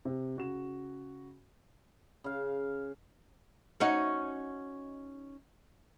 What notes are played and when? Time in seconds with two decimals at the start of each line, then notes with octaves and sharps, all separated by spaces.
0.05 C3
0.36 C#3 F#4 E7
2.24 C#3 F5
3.80 C#4 D#4 F#4